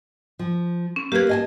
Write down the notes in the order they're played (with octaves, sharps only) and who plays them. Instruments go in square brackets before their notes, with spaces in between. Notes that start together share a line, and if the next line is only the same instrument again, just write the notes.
[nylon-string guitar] F3
[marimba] C#4
[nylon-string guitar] A#3 B4 [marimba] G4 G#6
[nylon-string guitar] D#5 G#5 A5